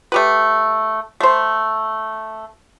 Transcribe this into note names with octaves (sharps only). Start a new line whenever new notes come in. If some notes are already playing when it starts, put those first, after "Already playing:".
A3 G4 B4
A3 C5